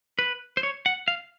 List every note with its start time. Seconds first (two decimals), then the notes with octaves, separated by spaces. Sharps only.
0.19 B4
0.57 C5
0.63 C#5
0.86 F#5
1.08 F5